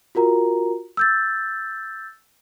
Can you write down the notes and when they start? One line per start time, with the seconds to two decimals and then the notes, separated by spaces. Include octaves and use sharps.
0.15 F4 F#4 A#4 A#5
0.97 E6 G6 A6